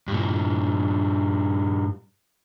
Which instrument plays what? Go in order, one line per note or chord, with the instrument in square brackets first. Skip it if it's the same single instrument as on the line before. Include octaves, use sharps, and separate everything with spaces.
[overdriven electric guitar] G2 A#2